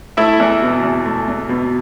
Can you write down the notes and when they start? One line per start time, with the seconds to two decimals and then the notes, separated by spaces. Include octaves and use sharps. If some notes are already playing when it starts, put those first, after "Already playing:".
0.17 A3 E4 E5
0.40 E2
0.62 B2
0.83 E2
1.06 A3
1.28 E2
1.49 B2